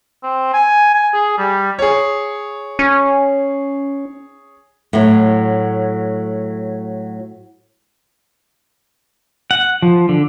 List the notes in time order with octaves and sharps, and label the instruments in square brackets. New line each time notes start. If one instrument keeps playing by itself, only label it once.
[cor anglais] C4
G#5
G#5
G#4
G3
[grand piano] G#4 C#5
[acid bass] C#4
[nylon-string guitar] A2 F#3
[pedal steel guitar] F#5
F3
D3